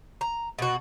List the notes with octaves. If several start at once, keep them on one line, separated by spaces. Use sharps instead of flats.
A#5
B2 F#4